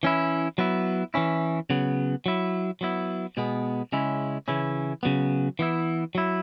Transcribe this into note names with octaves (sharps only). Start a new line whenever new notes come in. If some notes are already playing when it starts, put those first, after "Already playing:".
E3 C#4 E4
F#3 B3 E4
E3 C#4 E4
C#3 F#3 B3
F#3 E4
F#3 B3 E4
B2 G#3 B3
C#3 G#3 C#4 E4
C#3 E3 C#4 E4
C#3 F#3 B3
E3 B3 E4
F#3 E4